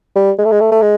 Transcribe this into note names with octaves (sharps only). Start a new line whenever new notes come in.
G3
G#3
A3
G#3
A3
A3
G#3